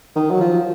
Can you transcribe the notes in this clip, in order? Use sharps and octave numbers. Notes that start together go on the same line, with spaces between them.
D#3
F#3
F3